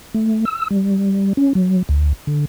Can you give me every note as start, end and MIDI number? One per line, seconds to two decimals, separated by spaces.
0.14 0.45 57
0.45 0.68 88
0.70 1.33 55
1.37 1.53 61
1.55 1.83 54
1.89 2.13 38
2.27 2.45 50